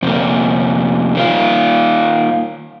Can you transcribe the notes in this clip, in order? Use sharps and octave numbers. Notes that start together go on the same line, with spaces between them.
F2 C3 A#3
D#3 A#3 F4